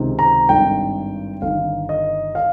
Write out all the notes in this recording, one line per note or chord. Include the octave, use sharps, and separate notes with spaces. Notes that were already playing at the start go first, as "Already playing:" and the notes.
Already playing: C#2 C3 D#3
A#5
G#1 G2 D#3 G5
G1 G2 D#3 F5
D#5
F5